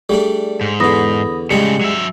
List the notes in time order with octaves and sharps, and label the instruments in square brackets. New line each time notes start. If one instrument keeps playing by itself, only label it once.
[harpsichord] G3 A3 D4 [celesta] G#4
[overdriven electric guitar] G#2
[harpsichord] E2 D3 [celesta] B5 D#6 A#6
[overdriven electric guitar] A2 C#3 [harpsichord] G3 G#3 [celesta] C#7
[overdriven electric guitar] F#3 E5